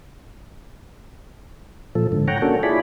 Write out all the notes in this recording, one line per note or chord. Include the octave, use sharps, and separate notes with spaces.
A#2 F3 A4
G#2 D3
C#5 F#5 G5 A#5
A#3 C#4 D4 F#4 A4
E4 F4 G#4 C#5 D5 B5